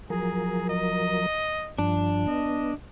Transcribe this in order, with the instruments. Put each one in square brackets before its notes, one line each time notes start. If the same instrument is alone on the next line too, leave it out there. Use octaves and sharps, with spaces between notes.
[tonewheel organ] F3 F#3 A#4 [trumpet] G#4
[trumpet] D#5
[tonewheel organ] G2 F3 [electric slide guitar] D4
[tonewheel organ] B3 [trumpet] D#5